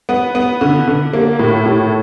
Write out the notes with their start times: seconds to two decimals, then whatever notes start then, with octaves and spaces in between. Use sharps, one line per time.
0.09 B3
0.35 B3
0.61 D3
0.88 D3
1.13 A#3
1.39 A2
1.66 A2